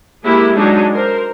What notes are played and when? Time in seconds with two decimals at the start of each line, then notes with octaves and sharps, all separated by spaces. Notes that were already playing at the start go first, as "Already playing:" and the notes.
0.25 G#3 A#3 E4 G4
0.56 F#3 G#3 D4 D#4
0.93 A#4 C5